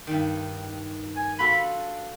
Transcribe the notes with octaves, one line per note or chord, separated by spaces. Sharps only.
G2 D#3
G#5
F4 F#4 A4 B5
D4